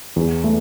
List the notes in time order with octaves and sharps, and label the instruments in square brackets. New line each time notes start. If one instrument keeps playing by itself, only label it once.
[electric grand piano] E2
A3